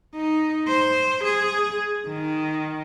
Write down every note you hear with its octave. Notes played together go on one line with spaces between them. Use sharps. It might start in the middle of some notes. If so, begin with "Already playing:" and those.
D#4
C5
G#4
D#3